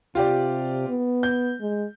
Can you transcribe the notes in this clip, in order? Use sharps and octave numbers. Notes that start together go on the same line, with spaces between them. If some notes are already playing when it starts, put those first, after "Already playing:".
C3 F4 G4 D5
B3
G6
G#3